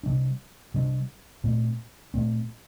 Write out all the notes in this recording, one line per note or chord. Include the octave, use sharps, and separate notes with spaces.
C3 G3 D4
C3 G3 D4
A#2 A3 C4
A#2 A3 C4